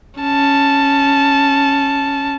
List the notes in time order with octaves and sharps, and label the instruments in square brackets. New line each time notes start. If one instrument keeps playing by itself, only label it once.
[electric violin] C#4 A5